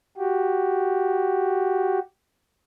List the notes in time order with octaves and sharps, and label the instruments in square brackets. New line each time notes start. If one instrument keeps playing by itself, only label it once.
[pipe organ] F#4 G4